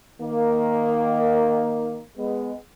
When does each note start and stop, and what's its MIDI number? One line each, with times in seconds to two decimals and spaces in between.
0.20 2.00 51
0.20 2.00 58
2.18 2.53 56
2.18 2.53 59